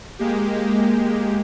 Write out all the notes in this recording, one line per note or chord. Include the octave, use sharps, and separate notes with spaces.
G#3 A#3 G4